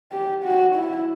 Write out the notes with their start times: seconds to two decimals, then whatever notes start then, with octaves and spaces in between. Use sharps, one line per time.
0.12 G4
0.44 F#4
0.75 E4